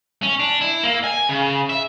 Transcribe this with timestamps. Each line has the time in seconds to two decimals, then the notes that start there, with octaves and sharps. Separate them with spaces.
0.23 C#4
0.39 D4
0.61 E4
0.83 A#3
1.04 G#5
1.29 C#3
1.69 E5